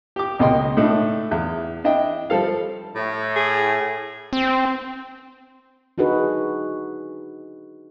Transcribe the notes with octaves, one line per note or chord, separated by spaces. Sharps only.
G4 D6
C#2 B2 A#3 D#5 G5 C6
A2 A3 D4 D#4
E2 E5
D4 E4 D#5 E5 G5
F3 G3 A4 F5
A2
G#4
C4
D4 D#4 F#4 G#4 B4